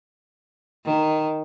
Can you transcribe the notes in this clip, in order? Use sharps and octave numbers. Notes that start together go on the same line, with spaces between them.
D#3